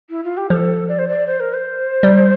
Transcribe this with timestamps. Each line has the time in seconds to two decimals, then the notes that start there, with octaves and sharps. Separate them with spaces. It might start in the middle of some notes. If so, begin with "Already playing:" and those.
0.10 E4
0.24 F4
0.37 G4
0.50 F3 A4
0.89 D5
0.98 C5
1.08 D5
1.27 C5
1.40 A#4
1.53 C5
2.03 G3